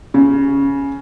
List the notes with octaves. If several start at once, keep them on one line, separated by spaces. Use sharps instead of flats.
C#3